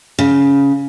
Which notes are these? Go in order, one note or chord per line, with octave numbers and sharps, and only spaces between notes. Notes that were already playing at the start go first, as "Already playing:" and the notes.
C#3